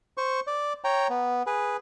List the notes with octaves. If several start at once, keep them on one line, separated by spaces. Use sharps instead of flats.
C5 C#6
D5
C#5 G5 A#5
B3
G#4 B4